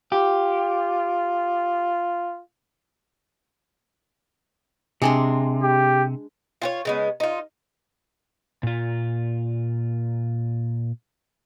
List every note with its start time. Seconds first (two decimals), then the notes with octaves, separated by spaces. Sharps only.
0.12 F4 G4
5.02 C3 G#3 D4 C6
5.62 G4
6.62 F4 G4 C#5
6.85 C#3 G#3 B3
7.20 D#4 F4
8.63 A#2 F4